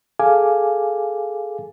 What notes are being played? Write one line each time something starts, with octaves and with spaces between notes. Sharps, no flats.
G#4 A4 F5 G#5 D6